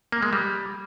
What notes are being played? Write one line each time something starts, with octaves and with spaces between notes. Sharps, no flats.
A#3
G#3
G3